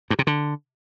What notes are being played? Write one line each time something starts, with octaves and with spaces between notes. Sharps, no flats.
G2
C3
D3